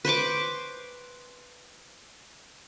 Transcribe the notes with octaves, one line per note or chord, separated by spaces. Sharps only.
B4 C5 C#6 D6